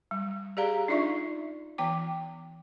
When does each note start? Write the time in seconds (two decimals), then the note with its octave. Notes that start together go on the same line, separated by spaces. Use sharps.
0.11 G3
0.57 G4 G#4 D5 F5 A#5
0.88 D4 D#4 F4 D5 E5 C#6
1.78 E3 B3 G5 D6